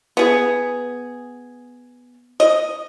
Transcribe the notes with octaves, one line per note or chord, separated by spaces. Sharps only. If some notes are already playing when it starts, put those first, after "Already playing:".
B3 G#4
D#5